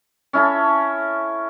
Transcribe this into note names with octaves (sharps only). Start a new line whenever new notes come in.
C#4 E4 A4